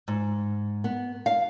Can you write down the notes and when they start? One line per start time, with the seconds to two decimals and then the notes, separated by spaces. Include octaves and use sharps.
0.08 G#2
0.84 B3
1.26 F5